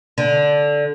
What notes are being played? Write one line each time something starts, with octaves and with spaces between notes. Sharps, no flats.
D3